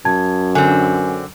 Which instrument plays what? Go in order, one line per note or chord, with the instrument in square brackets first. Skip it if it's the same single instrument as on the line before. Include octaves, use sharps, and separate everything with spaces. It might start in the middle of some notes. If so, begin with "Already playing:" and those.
[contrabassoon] F#2 [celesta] A5 G#6
[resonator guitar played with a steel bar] D3 C4 [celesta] G#5